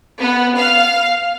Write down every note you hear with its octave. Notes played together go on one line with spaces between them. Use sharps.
B3
F5